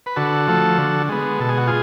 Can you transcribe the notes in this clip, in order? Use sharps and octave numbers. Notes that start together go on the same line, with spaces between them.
B4
D3 F#4 A4
F3 A3
D3
G#3 B3
B2 A4
G#4
F#4
F4 G#4